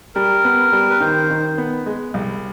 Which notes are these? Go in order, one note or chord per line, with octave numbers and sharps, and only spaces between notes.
G3 A#4
B3
G3
B4
D#3 C5
D#3
B3
G#3
C2